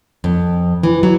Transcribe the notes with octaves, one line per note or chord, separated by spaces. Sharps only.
F2
E3
F#3